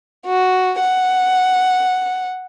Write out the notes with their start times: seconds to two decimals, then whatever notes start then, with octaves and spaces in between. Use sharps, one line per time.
0.26 F#4
0.80 F#5